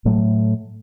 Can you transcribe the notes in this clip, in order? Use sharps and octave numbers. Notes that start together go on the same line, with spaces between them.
A2 F#3 A3